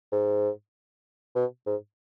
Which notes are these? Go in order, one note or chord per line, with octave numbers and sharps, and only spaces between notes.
G#2
B2
G#2